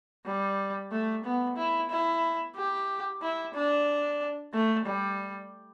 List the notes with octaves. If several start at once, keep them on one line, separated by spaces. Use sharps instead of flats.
G3
A3
B3
E4
E4
G4
E4
D4
A3
G3